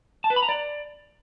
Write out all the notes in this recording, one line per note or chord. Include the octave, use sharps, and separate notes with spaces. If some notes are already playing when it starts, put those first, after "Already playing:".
A5
B4
B5
A#5
D5